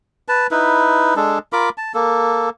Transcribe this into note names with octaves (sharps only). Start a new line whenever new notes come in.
B4 A5
D#4 E4 B4
G#3 D4 A4
F4 A#4 B5 D6
A5
A#3 A4